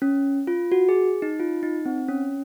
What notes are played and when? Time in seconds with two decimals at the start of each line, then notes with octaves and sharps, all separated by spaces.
0.02 C#4
0.47 F4
0.72 F#4
0.89 G#4
1.22 D#4
1.40 F4
1.63 D#4
1.85 C4
2.08 C#4